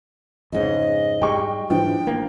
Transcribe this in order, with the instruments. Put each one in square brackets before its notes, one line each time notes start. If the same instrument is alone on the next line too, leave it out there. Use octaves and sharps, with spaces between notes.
[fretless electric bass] F2 G#2 C#3 [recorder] D#5
[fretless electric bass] G#2 G3 G#3 [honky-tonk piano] G5 C#6
[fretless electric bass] G#2 E3 [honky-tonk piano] F3 D4 [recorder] G5
[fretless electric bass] A1 A#3